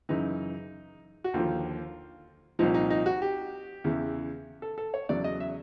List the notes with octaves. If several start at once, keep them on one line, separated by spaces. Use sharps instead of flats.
F#2 C#3 E3 D#4
F#4
D#2 D3 F3 F4
C2 A#2 F3 D#4
D#4
D#4
F#4
G4
E2 C#3 E3
A4
A4
C#5
E2 C#3 F#3 D5
D#5
E5